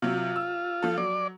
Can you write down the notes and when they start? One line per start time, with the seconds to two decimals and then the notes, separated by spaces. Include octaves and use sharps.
0.02 C3 F#3 F4
0.36 E6
0.82 F3 A4
0.98 F#3 D5